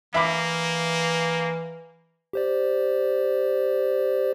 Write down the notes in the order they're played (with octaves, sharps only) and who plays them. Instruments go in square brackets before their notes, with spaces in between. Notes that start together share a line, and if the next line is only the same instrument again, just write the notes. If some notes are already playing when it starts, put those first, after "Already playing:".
[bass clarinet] E3 [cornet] A#3 [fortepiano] E5 B5 D6
[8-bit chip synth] G4 C5 D5